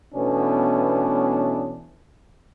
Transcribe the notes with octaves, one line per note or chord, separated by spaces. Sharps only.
B2 E3 A3 B3 C#4 D4